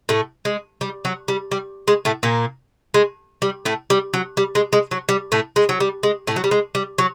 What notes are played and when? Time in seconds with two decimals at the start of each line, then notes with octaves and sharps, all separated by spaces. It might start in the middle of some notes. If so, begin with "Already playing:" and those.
0.09 A2 A3
0.45 G#3
0.81 G3
1.05 F#3
1.28 G3
1.52 G3
1.88 G#3
2.05 A2 A3
2.23 A#2 A#3
2.94 G#3
3.42 G3
3.65 A2 A3
3.90 G3
4.14 F#3
4.37 G3
4.55 G#3
4.73 G#3
4.91 F#3
5.09 G3
5.32 A2 A3
5.56 G#3
5.69 F#3
5.80 G3
6.03 G#3
6.27 A2 A3
6.36 F#3
6.44 G3
6.51 G#3
6.75 G3
6.98 F#3